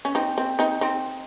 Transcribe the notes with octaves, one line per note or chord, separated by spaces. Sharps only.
C#4
C4 D#4
C4
C4 D#4
C4 D#4